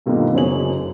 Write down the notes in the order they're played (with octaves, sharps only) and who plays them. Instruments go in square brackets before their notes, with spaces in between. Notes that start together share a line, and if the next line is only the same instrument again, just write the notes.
[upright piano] G2 B2 D3 D#3 A#3 F4
F#1 F#2 G#4 C#5 F#7